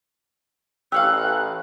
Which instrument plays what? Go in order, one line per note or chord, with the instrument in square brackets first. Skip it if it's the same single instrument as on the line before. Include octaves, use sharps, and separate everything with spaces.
[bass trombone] A1 [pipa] G4 C#5 F5 [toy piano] E6 [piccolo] F#6